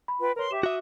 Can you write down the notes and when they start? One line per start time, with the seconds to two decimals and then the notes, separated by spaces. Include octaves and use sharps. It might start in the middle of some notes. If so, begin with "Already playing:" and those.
0.08 B5
0.20 F4 B4 G5
0.36 A#4 B4 C#5 C6
0.51 G4 E5 D6 E7
0.63 F#4 E5 D#6